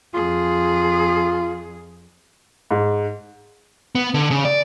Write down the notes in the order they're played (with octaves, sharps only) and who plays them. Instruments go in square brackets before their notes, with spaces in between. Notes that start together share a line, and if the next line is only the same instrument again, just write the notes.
[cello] F2 G#4 [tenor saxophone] F4
[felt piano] G#2
[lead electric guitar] B3
D3
C#3
D5